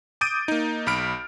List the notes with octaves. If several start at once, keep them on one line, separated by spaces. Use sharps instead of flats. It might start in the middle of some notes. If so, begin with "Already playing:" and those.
D6 D#6 G6 A6 D7 D#7
A#3 D#4
B1 B5 F6 D7